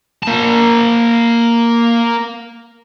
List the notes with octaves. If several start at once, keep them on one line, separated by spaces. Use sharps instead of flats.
A#3 A5